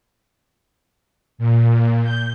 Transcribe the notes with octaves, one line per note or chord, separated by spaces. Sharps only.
A#2
G6